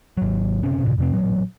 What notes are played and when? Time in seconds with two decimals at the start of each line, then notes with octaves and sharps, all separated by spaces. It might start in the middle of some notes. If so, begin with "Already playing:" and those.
0.17 G#1 F#3
0.63 F#1 C3 C#4
0.83 D2 A2 C3
0.98 F2 C3 C4
1.13 A1 A#2 F#3